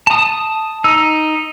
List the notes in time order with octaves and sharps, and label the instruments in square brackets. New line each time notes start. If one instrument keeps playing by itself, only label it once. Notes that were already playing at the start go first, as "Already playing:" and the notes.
[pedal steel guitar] A5 D#6
[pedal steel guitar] D#4 [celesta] E6